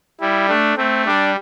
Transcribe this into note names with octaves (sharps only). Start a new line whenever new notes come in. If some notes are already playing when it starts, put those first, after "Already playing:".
G3 E4
A3 D4
A3 C4
G3 D4